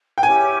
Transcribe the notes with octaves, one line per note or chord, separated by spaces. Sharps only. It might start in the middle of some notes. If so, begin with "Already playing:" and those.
G5
C#4 E4 G4 G#5